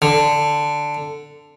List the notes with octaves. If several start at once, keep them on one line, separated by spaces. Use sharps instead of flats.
D3